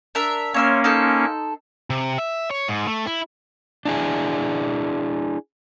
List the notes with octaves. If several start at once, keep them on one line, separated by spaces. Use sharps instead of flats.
D4 A#4 E5
A#3 C#4 C#5 E5 C6
D#4 A4 C5
C3
E5
C#5
G#2
A3
E4
D4 E4 G#4